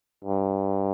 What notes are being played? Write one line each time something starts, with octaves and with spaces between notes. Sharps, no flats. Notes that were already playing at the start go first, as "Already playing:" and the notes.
G2